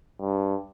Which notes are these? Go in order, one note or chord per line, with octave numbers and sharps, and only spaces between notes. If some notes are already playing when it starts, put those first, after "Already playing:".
G2